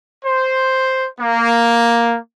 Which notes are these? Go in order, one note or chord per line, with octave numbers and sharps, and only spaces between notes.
C5
A#3